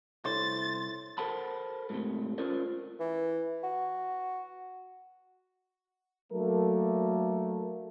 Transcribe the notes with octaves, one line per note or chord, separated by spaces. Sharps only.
C2 E4 A4 C5 C#5 A6
A4 A#4 C5 F#5 A5 B5
G#2 C3 A3
C#4 F4 A4 A#4 C5 D5
E3
F#4
F#3 A3 A#3 D4 A4 A#4